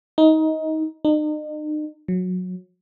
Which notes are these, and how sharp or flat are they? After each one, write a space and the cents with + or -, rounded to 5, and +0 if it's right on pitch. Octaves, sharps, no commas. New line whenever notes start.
D#4 +20
D#4 -40
F#3 -20